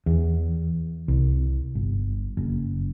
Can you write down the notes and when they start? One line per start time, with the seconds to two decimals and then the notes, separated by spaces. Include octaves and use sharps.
0.06 E2
1.08 C2
1.75 G1
2.37 F#1